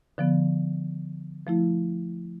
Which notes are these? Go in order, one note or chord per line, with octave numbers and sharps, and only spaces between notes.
D3 F3 B3
F3 A3 E4